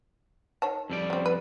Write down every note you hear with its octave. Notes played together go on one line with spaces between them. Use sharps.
D#3 C#5 A5
F2 G3 D5
C#3 C4
B4